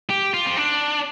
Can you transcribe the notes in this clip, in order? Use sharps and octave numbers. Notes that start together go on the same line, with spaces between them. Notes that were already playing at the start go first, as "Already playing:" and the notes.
G4
F4
C4
D4